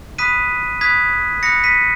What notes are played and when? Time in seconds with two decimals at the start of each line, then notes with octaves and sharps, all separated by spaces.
0.18 B5 D#6 F#6 B6 D#7
0.81 B5 D#6 F#6 G#6 B6
1.43 B5 D#6 F#6 A#6 C#7
1.64 B6 D#7